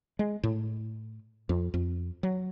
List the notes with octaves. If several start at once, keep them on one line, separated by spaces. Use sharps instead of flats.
G#3
A2
F2
F2
F#3